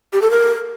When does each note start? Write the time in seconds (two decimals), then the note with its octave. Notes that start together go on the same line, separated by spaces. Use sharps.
0.13 G4
0.22 A4
0.31 A#4